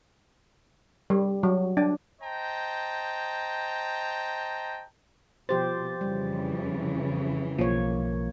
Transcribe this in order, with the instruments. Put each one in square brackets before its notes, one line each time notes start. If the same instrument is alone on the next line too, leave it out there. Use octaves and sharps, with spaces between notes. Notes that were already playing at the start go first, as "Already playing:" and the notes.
[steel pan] G3
F#3
D4
[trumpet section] C5 D#5 G5 A5 A#5
[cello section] B2 [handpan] F3 G4 C5 [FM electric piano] A6
[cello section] F2 C#3 E3 [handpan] G3
[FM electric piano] B1 F3 [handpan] A#3 C#5